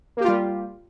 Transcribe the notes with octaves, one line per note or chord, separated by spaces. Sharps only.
G3 A#3 F4 G4